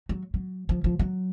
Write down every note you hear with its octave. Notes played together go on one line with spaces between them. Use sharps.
F#3
F#3
F3
F3
F#3